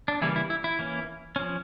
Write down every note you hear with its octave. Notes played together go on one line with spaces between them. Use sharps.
D4
C#3 E3 G3 A#3 E4
E4
E4
E4
E3 A#3 C#4
F3 C#4